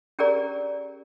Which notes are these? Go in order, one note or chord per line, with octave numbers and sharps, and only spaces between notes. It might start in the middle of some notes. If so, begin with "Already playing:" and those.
C#4 G4 G#4 A#4 D5 A#5